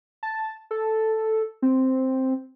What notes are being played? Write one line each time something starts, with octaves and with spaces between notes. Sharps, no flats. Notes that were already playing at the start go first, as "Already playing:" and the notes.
A5
A4
C4